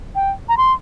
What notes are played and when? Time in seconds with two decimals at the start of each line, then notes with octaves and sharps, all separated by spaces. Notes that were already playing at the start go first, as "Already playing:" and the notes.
0.15 G5
0.49 A#5
0.58 C6